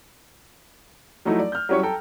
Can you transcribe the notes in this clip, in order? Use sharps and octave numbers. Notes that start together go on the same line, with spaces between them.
F3 F#3 A3 D#4 E4
D5
F6 G6
F#3 G3 C#4 E4 C#5
A4 G5 A#5